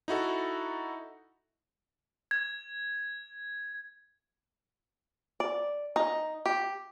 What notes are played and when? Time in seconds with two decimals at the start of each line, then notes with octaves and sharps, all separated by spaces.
0.08 D#4 E4 F#4 A4
2.31 G#6
5.40 D5
5.96 D#4
6.46 G4